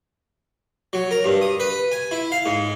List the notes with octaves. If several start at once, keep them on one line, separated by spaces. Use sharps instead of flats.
F#3
A#4
G2
D#6
B4
G#5
E4
F5
G#2